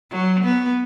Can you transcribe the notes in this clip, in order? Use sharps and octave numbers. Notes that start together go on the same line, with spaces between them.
F#3
B3